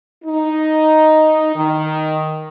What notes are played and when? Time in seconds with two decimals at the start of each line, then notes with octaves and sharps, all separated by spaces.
0.25 D#4
1.55 D#3